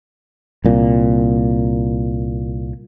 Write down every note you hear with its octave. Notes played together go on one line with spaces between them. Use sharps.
C2 A#2